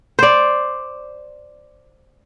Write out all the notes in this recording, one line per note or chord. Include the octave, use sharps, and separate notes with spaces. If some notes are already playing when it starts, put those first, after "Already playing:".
C5 D5